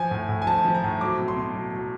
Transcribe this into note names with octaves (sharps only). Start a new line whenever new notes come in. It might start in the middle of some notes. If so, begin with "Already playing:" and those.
Already playing: F3 G#5
A2
A2
G#5
F3 A5
F3
A#5
A2
F#3 D6
B2
C6
B2
F#3
F#3